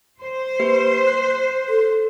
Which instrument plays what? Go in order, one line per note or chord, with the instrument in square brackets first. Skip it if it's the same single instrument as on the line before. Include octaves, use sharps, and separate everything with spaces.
[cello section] C5
[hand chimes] A#3 G4 B4
F#6
[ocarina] A4